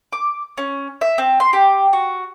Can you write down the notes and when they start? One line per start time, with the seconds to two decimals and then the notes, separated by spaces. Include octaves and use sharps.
0.13 D6
0.58 C#4
1.01 E5
1.18 C4
1.40 C6
1.53 G4
1.93 F#4